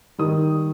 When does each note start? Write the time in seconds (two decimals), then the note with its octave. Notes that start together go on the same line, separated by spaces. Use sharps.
0.18 D#3 G3 D#6